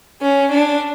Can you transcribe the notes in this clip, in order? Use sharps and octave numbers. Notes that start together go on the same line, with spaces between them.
C#4
D4